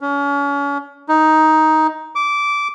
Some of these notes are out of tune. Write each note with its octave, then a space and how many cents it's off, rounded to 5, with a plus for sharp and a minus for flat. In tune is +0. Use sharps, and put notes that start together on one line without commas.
C#4 +35
D#4 +10
D6 -15